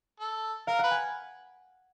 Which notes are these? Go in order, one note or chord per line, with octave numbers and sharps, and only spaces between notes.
A4
A#4 F5
B4 F#5
G#5